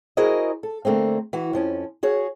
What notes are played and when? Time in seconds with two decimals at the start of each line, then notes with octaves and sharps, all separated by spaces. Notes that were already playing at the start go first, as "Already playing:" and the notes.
0.17 E4 F#4 G#4 A#4 C5 D#5
0.63 A4
0.85 D3 A3 A#3 C4
1.33 E3 F#4
1.53 F2 F3 C#4
2.03 F#4 G#4 C#5